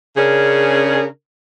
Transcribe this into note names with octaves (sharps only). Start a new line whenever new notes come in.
C#3 C#4 D4 G#4 A#4